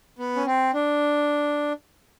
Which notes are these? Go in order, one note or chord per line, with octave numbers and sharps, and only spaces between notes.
B3
C#4
C4
D4